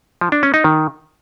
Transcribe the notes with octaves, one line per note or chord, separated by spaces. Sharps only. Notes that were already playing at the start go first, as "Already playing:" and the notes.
F3
D4
C#4
D#4
D#3